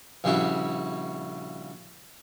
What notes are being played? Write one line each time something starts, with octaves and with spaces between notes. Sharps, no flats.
A#1 C#3 G3 E4 F#4